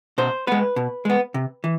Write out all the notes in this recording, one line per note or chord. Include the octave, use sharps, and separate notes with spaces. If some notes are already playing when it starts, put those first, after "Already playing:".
B2 C5
G#3 B3 B4
B2
G#3 B3
C3
E3